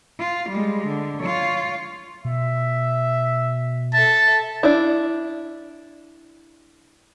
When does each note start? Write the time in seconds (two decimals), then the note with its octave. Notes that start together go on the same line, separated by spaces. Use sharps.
0.19 F4
0.49 G3 G#3
0.87 D3
1.19 F4 C#5
2.25 B2 E5
3.94 A4 E5 A5
4.63 D4 E4